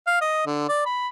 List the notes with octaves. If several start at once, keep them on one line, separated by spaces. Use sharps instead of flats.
F5
D#5
D3
D5
B5